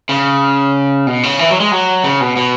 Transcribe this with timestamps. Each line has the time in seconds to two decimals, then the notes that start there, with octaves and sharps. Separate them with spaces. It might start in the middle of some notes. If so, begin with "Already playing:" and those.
0.09 C#3
1.07 B2
1.23 C#3
1.39 E3
1.50 F#3
1.60 G#3
1.71 F#3
2.04 C#3
2.21 B2
2.37 B2